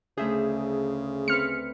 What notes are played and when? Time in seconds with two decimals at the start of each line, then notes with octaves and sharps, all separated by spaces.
0.18 D2 C#3 G#4 E5 G6
1.28 C4 B4 F6 C#7